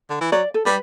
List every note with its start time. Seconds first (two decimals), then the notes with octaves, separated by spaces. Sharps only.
0.10 D3
0.21 E3
0.32 F#3 D5
0.54 A4
0.66 G3 B4